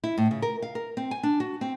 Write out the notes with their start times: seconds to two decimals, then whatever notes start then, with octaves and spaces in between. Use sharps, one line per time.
0.04 E4
0.18 A2
0.31 C#3
0.42 A#4
0.62 F5
0.75 A#4
0.97 C4
1.11 G#5
1.23 D4
1.40 F#4
1.61 C4